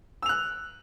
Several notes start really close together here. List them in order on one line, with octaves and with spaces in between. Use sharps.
E6 F7 F#6